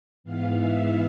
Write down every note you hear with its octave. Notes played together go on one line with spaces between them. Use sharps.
G#2 E3 B3 F5
E5